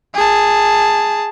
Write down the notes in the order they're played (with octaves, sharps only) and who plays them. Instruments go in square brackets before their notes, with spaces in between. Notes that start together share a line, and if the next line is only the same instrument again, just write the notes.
[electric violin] G#4 A5